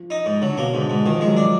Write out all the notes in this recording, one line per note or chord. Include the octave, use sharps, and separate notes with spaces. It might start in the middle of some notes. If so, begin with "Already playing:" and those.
Already playing: F3
D#4
G#2
D3 F#3
B2 A#3
G#2 D3
G#2
D#3 F3
F3
G#3
F#3
D4